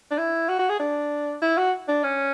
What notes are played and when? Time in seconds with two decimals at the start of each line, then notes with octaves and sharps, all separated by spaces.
0.11 D4
0.18 E4
0.49 F#4
0.59 F#4
0.69 G#4
0.80 D4
1.42 E4
1.58 F#4
1.88 D4
2.04 C#4